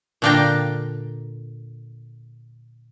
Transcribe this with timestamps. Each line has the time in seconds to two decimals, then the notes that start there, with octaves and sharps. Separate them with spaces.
0.22 A#2 D3 D4 F5 G5 A#5